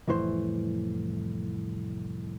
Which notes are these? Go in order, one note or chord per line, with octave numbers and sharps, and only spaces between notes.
C2 F2 A2 E3 C5